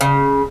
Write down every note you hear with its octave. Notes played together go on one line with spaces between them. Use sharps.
C#3